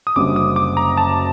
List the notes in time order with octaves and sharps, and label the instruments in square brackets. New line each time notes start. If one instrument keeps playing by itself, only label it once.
[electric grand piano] D#6
[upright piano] F#1 F#2 D3 G3 [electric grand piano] D6
[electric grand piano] D#6
D6
A#5
A5